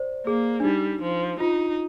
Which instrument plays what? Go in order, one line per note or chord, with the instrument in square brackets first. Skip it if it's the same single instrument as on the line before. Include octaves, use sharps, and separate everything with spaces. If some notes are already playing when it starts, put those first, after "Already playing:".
Already playing: [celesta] C5 D5
[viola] A#3 [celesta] G#4
[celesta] D4
[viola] G3 [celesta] D#4
[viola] F3
[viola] D#4 [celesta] F4